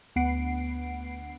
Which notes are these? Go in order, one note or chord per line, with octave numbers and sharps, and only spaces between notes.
D2 B3 F#5 C7 D7